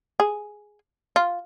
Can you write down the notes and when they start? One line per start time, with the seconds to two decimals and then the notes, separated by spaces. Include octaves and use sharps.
0.20 G#4
1.16 F4